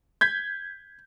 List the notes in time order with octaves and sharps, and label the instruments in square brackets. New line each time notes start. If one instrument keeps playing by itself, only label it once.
[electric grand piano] G6 G#6 B6